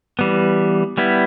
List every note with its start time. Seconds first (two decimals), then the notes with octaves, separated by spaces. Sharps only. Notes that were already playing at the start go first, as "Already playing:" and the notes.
0.19 E3 G3 B3
0.98 G3 B3 E4